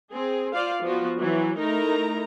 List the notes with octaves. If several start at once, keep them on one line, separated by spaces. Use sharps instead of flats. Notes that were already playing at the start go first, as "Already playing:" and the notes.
C4 G#4
F4 C5 D5 F5
F3 B3 F4 F#4
E3 F#3
A3 D#4 E4 A#4 A#5